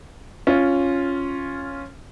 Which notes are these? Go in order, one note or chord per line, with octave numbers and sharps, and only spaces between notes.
C#4 F4